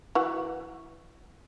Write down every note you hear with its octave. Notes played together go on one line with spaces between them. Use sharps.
E3 F#4